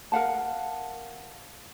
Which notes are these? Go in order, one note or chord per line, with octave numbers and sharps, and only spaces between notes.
A#4 F5 F#5 A5